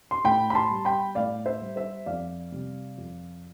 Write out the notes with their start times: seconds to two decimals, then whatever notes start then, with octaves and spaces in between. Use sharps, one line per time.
0.11 C6
0.24 A2 G5 B5
0.50 B5
0.55 A5 C6
0.71 G3
0.85 G5 B5
1.15 A2 D5 F5
1.46 C5 E5
1.61 G3
1.76 C5 E5
2.06 F2 D5 F5
2.52 C3 G3
2.98 F2